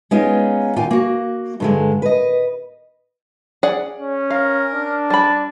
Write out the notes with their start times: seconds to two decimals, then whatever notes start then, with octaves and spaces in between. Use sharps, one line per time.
0.11 G#3 B3 C#4 D#4 F4
0.76 D#2 A#2 F4 F5 G5 G#5
0.91 A#3 F#4
1.60 G2 D3 G#3
2.02 B4 D#5
3.63 G#4 D5 F#5
3.99 C#4
4.31 A#4 F5
4.74 D4
5.10 G3 A5 B5